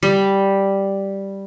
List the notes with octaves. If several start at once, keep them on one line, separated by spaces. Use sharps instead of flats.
G3